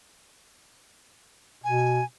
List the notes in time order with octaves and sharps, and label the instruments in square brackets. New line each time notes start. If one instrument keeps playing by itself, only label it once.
[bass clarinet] B2 [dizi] G#5